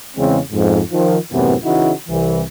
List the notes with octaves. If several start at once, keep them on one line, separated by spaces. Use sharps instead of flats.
E2 C#3 E3 G#3 C4
F2 G#2
D#3 F3
F#2 A2 C3 E3 B3
C#3 E3 D#4 E4 F#4
C2 E3